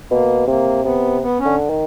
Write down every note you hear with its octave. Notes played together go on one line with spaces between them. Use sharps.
B2 A#3
C3 A#3
C3 B3
B3
C#4
D3
D#3